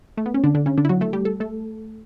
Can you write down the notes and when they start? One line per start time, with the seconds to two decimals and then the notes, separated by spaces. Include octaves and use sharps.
0.18 A3
0.26 B3
0.34 C#4
0.44 D3 D4
0.55 D3 D4
0.66 C#3 C#4
0.78 D3 D4
0.85 E4
0.89 F#3 F#4
1.01 A3 A4
1.13 G3 G4
1.25 A4
1.40 A3 A4